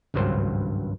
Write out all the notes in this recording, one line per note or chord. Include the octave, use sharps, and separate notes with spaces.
G#1 C#2 G2 F#3 C5